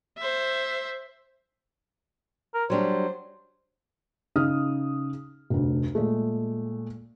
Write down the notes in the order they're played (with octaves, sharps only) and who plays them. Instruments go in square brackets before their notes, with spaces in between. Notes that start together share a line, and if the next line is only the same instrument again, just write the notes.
[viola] C5 E5
[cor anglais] A#4
[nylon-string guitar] F#3 G3 D4 [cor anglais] C5
[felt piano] C#3 D#4 D#6 F6
F1 D2
A#2 G#3 A3